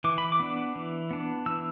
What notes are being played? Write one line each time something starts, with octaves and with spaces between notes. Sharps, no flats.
E3 D6
B5
D6
B3 D4
E3
B3 D4
E3 E6